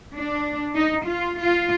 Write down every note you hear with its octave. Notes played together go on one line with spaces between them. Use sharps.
D4
D#4
F4
F4